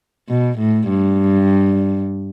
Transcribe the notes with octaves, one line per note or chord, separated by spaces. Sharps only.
B2
A2
G2